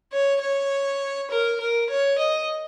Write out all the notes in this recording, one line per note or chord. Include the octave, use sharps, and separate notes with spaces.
C#5
C#5
A#4
A#4
C#5
D#5